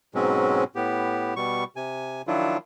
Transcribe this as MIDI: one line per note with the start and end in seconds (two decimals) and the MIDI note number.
0.15 0.64 44
0.15 0.64 47
0.15 0.64 54
0.15 0.64 56
0.15 0.64 60
0.15 0.64 61
0.75 1.34 45
0.75 1.34 59
0.75 1.34 67
1.36 1.64 47
1.36 1.64 55
1.36 1.64 85
1.76 2.22 48
1.76 2.22 80
2.27 2.57 51
2.27 2.57 53
2.27 2.57 54
2.27 2.57 62
2.27 2.57 64
2.27 2.57 65